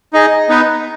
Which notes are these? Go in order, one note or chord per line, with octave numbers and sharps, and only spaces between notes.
D#4 G#4 D#5
B3 D#4 B4